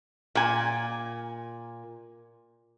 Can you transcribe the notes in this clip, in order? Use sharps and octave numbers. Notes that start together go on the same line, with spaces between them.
A#2 G#5